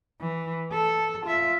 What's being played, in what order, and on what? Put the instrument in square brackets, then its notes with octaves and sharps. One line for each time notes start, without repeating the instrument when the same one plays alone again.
[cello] E3
A4
F4 E5